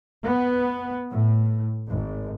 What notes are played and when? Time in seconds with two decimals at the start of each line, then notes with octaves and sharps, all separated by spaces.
0.24 B3
1.09 A2
1.87 G#1